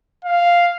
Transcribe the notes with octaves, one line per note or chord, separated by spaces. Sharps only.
F5